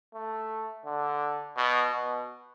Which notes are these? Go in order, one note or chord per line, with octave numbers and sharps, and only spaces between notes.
A3
D3
B2
B2